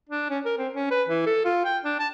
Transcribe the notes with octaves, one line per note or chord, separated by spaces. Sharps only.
D4
C#4
A#4
C4
C#4
B4
E3
A4
F4
G5
D4
A5